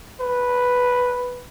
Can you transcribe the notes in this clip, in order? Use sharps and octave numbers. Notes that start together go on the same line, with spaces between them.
B4